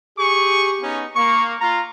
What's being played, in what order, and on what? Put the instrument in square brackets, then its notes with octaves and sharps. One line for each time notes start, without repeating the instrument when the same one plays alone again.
[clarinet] G4 [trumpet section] G#4 C#6
[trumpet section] B3 C#4 D#4
[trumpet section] A#3 [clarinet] C#6
[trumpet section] F4 [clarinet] A#5